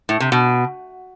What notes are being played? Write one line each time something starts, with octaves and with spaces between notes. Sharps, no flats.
A2
C3
B2